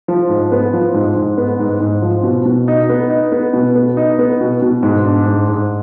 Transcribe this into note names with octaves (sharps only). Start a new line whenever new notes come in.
F3
G#2
B3
F3
G#2
G#2
B3
G#2
G#2
F3
B2
B2
D#4
B3
D#4
B3
B2
B3
D#4
B3
B2
B2
G#2
D4
G#2
G#2